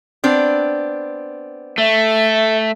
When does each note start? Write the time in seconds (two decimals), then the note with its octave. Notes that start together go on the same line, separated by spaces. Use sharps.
0.24 B3 C4 D4
1.78 A3 E5